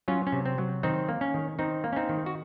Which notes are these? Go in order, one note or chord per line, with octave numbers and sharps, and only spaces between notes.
F#3 C#4 F4
C#4
C3
C4
F#3
D#3 C4 D#4
A#3
C#4
D#3
D#3 C4 D#4
A#3
C#4
C4 D#4
D#3
F#4